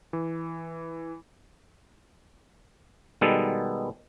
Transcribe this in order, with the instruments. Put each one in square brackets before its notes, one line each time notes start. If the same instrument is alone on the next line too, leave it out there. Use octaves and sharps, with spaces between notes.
[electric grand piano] E3
[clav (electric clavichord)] B2 D#3 G3 G#3 B3 A4